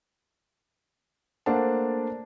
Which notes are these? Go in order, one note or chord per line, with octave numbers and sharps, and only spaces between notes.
A3 A#3 D4 C5 F#5 A5